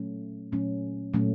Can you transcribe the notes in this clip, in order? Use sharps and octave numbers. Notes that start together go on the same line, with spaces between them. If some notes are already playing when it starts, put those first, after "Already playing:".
Already playing: A#2 F#3 A3 C#4
A#2 F#3 A3 C#4
A#2 F#3 A3 C#4